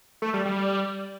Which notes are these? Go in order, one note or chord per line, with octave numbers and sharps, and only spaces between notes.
A3
G3
G3